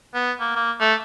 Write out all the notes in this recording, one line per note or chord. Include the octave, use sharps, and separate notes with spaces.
B3
A#3
A#3
A3